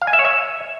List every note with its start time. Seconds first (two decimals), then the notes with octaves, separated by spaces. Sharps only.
0.01 F5
0.07 G#5
0.13 E5
0.19 C#5
0.25 E5